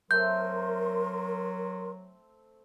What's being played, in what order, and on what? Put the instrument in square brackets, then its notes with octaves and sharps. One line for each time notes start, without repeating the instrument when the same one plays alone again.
[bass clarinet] F#3 [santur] A3 C4 [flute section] A#4 C6 [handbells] G6